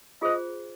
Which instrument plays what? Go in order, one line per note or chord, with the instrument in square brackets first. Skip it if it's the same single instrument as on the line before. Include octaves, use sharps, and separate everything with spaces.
[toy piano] F4 G#4 C5 [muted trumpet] D#5